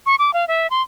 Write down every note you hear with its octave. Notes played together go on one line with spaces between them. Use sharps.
C#6
D6
F5
E5
C6